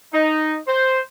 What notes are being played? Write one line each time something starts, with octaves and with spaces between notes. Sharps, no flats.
D#4
C5